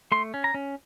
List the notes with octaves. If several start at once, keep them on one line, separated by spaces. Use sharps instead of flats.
A3 C6
C#4
A#5
C#4